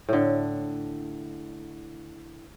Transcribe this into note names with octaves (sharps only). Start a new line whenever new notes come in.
A2 D3